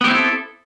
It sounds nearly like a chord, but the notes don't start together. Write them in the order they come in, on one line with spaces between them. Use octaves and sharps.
B3 G4 C4 E4 A4